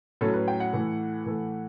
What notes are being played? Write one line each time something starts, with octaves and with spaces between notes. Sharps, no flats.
A2 F#3 C#4 A4
B4
G5
F#5
A2 E3 A3
A2 E3 A3